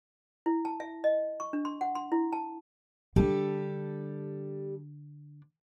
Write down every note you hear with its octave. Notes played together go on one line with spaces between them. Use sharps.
E4
A5
E5
D#5
C#6
D4
C6
F#5
C6
E4
A5
D3 G3 D4 G4 A4